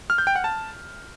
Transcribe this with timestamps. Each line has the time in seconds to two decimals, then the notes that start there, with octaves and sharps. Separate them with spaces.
0.10 F6
0.18 G6
0.27 G5
0.36 F#5
0.44 A5